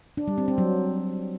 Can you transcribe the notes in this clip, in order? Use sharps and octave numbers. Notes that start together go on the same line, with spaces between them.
D4
G3
C4
C4
F#3